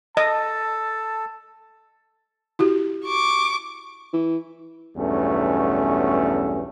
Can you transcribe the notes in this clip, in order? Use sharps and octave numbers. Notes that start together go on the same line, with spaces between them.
A4 D#5 A5
E4 F#4 G4
C#6 D6
E3
B1 E2 G2 A3 C#4